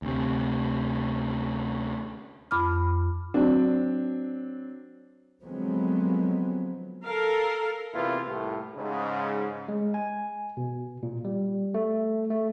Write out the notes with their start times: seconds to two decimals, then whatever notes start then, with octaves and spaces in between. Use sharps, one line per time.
0.02 D2 C3
2.51 F2 B5 D6 F6
3.34 F#3 C4 D4
5.42 D3 F3 F#3 G#3 B3 C4
7.03 A4 A#4 F5
7.94 E2 C3 A#3 E4 F4 B4
8.27 C2 A2
8.76 G#2 C#3
9.69 G#3
9.94 G#5
10.57 B2
11.03 A#2
11.25 G3
11.74 A3
12.30 A3